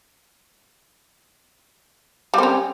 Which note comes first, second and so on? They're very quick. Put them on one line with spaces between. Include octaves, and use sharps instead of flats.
G3 C4 C#4